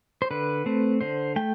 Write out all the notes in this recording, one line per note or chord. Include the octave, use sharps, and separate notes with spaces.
C5
D3 B4
A3 C4
D3 C5
A3 G5